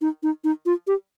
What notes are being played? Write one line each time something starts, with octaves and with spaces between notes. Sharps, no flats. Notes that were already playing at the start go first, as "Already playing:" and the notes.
D#4
D#4
D#4
F4
G4